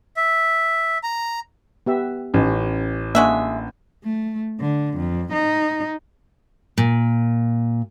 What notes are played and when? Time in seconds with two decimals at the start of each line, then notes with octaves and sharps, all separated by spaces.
0.17 E5
1.03 A#5
1.86 B3 G4 E5
2.34 A1 C#4 D#4
3.15 G#3 A#3 D4 F#4 E5
4.04 A3
4.60 D3
4.97 F2
5.33 D#4
6.78 A#2